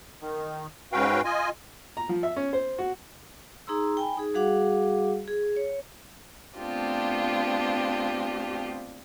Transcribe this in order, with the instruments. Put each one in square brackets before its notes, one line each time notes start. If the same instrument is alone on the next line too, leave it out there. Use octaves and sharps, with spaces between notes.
[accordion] D#3
G#2 C#4 F#4 B4 F5 G5
F4 D#5 G#5
[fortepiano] A#5
F3
E5
C#4
C5
F#4
[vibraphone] D#4 G#4 A#5 C6 E6
G5 G#5 B5
D#4 G#4
G3 F#4 G#4 F5 F#5 D6
G#4
C#5
[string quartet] A3 B3 C4 D4 F4 G4